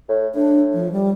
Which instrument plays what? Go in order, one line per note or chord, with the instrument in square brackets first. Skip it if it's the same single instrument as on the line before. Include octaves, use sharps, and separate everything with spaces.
[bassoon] A2
[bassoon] A2 [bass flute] D4
[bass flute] F3
G3